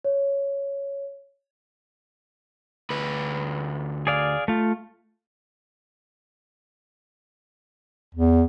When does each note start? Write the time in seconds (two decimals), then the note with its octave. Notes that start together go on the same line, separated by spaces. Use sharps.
0.05 C#5
2.90 D2 B4
4.07 G#4 D5 F5
4.48 A3 F4
8.15 E2